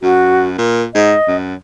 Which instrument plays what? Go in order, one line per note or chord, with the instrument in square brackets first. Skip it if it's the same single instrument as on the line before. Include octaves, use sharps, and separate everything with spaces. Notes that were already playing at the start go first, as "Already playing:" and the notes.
[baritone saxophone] F#2 [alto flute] F#4
[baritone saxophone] A#2 [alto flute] A#4
[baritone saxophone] G#2 [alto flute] D#5
[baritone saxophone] F#2